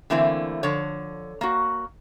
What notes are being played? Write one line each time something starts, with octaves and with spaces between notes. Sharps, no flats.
D3 E3 A3 A#3 C4 E4
D3 F3 C#5
A#3 F#4